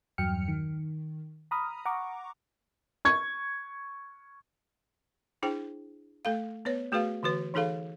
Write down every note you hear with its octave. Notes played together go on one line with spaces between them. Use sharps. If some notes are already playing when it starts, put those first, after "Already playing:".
E2 G2 F#3 G5 F6 C#7
D#3
A#5 B5 D#6 F6
F#5 A#5 C#6 D6
C#6 G#6
D4 E4 G#4 C5 G5
A3 A4 F5
B3 B4 C#5
A3 F#4 G#4 B4 F5
D3 E3 F#4 B4
E3 D#4 G#4 A4 F5